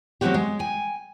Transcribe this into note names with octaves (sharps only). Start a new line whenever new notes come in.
F#3 A3 A#3 C4 F#4 G4
G#3
G5 G#5